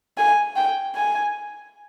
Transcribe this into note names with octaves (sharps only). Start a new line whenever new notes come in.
G#5
G5
G#5